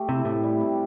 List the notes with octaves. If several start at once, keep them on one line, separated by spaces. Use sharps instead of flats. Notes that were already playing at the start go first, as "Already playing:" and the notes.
Already playing: A3 G4
C3 E4
A2 C3
G3
C3